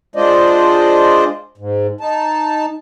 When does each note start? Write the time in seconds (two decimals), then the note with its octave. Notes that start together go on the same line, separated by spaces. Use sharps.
0.16 G#3 D4 F4 C5 D5 D#5
1.58 G#2
2.01 D#4 A5